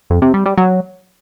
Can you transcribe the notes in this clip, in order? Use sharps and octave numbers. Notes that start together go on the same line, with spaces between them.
F2
C3
G3
G3
F#3